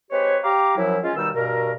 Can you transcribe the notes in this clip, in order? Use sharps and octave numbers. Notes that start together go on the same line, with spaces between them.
G#3 C4 G4 B4 C#5
G4 F5 A#5 D6
F#2 F3 F#3 E4
G#3 C#4 F4
D#2 B2 D#3 G3 D#4 E6
G2 B2 A#4